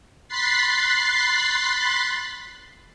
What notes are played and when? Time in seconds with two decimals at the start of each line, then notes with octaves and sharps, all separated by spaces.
0.28 B5 C6 F#6 A6 B6 C7